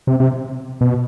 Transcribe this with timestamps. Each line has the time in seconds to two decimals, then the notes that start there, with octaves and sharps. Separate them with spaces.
0.07 C3
0.20 C3
0.81 B2